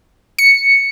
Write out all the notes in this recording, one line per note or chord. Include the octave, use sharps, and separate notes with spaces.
C#7